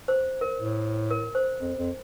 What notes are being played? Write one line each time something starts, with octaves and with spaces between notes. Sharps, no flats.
C5
A#4
A2
A#4
C5
F2
F2